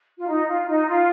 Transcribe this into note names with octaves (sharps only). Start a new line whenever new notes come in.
F4
D#4
F4
D#4
F4